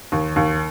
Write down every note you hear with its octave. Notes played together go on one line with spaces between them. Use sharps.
D#2
D#2